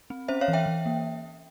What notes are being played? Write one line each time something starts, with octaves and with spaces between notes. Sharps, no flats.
C4
C#4 C5 E5
C#5 F5
E3
E5 G5
E3
A#3